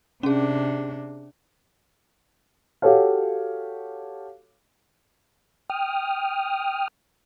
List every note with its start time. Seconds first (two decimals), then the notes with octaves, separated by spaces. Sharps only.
0.23 C3 C#4 D4 G#4
2.82 F#4 G4 A4 C#5 F5
5.70 G5 D#6 F6